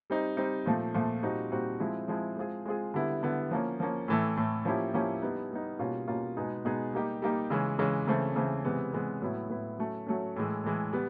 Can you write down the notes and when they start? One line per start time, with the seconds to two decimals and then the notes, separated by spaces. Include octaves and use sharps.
0.10 G3 C4 D#4
0.37 G3 C4 D#4
0.66 A#2 F3 A3
0.94 A#2 F3 A3
1.23 A#2 G3 C4 D#4 F#4
1.52 A#2 G3 C4 D#4 F#4
1.80 F3 G#3 C4 E4
2.08 F3 G#3 C4 E4
2.37 G#3 C4 F4 G#4
2.66 G#3 C4 F4 G#4
2.94 D3 G3 B3 E4
3.23 D3 G3 B3 E4
3.51 F3 A#3 C#4
3.80 F3 A#3 C#4
4.08 A2 E3 A3
4.37 A2 E3 A3
4.65 F3 A#3 C#4 E4 G4
4.94 F3 A#3 C#4 E4 G4
5.22 G3 B3 D#4
5.51 G3 B3 D#4
5.79 B2 G3 A#3 C#4 F4
6.08 B2 G3 A#3 C#4 F4
6.37 B2 G#3 B3 D#4 G#4
6.65 B2 G#3 B3 D#4 G#4
6.93 G3 A#3 D#4 G4
7.22 G3 A#3 D#4 G4
7.50 C#3 E3 G#3 C#4
7.79 C#3 E3 G#3 C#4
8.07 C#3 E3 A3 C4
8.36 C#3 E3 A3 C4
8.65 C3 E3 G#3 B3
8.93 C3 E3 G#3 B3
9.22 A2 F#3 B3 E4
9.50 A2 F#3 B3 E4
9.79 F#3 A3 C#4
10.07 F#3 A3 C#4
10.36 A2 E3 G#3
10.64 A2 E3 G#3
10.93 G3 B3